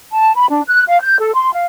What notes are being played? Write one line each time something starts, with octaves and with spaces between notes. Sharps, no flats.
A5
B5
D4
F#6
F5
G6
A4
C6
F5